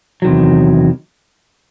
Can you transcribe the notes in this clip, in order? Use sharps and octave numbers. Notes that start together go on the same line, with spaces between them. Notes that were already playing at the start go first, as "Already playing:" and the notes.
E2 C3 D#3 F#3